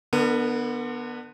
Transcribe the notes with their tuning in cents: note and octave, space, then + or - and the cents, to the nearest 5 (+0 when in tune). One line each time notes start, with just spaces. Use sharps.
D3 +20 B3 -15 A#4 -45